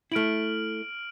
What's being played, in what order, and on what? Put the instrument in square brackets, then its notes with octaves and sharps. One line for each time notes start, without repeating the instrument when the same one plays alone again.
[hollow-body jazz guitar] A3 E4 [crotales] F6 D7 F#7